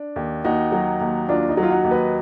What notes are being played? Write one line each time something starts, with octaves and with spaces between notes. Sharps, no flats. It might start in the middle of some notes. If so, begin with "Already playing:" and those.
Already playing: D4
D#2
D#2 D#4 F#4
F#3
D#2
D#2 D4 F4
D#4
F#3
F4
D#4 F#4
D#2
B4 D#5